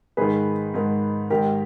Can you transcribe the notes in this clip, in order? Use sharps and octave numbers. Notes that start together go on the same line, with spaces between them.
G#2 D#3 G#4 B4
G#2 D#3
G#2 D#3 G4 A#4